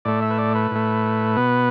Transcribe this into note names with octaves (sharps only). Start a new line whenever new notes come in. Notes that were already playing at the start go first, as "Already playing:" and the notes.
A2 A3 D5
E5
B4
D5
B4
A2 A3
B2 B3